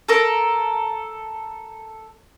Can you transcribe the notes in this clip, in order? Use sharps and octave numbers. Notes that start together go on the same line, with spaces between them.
A4 A#4